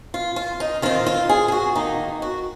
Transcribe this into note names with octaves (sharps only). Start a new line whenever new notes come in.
F4
F4
D#4
D#3 G#3 C4 D#4 F4
F4
G#4
G#4
F#4
F2 D#3 A#3 D#4
F#4